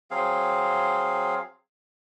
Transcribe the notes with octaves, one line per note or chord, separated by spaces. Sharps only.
F#3 C4 G#4 F5